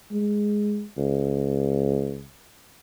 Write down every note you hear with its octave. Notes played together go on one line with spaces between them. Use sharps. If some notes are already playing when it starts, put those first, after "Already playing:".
G#3
C#2